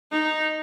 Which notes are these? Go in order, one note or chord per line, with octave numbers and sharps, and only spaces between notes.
D#4